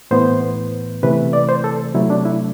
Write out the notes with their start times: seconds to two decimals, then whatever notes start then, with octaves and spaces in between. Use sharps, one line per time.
0.11 A2 E3 B3 C5
1.03 C3 E3 A3 B4
1.33 D5
1.49 C5
1.64 A4
1.95 C3 F#3 A3 E4
2.10 D4
2.25 E4